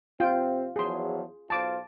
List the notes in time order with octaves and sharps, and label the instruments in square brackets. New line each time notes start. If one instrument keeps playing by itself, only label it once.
[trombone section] C3 C4 [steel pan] F4 G5
[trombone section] E2 F3 F#3 [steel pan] G#4 C6
[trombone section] B1 F4 C5 [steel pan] A5 D6